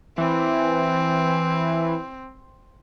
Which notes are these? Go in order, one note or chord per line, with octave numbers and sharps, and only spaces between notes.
E3 C4